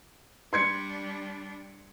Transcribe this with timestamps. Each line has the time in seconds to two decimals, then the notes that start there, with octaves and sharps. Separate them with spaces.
0.53 G3 D4 C6 G#6 C#7